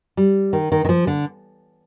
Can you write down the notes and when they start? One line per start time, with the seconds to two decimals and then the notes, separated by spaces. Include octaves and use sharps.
0.17 G3
0.53 D#3
0.72 D#3
0.85 D#3
0.89 F3
1.07 D3